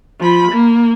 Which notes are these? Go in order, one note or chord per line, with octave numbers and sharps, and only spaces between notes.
F3 B5
A#3